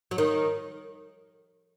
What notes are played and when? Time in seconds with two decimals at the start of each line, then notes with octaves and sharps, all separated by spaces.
0.11 F#3
0.18 D#3